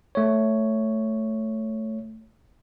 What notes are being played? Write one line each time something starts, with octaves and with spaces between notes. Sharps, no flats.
A3 C#5